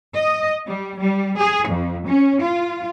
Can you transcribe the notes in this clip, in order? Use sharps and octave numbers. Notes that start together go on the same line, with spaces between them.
D#5
G3
G3
G#4
F2
C#4
F4